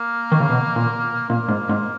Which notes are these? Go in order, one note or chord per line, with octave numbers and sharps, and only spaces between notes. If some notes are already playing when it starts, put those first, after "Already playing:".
Already playing: A#3
D#3
C#3
B2
A#2
A#2 A#3
G#2
G#2